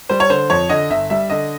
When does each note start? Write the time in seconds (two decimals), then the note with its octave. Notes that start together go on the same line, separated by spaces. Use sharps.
0.09 G3 C5
0.20 C#5
0.29 D3 C5
0.50 F2 C#5
0.69 D3 D#5
0.90 G1 E5
1.10 G3 E5
1.30 D3 D#5